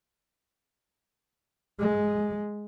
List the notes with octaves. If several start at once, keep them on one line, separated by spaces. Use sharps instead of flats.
G#3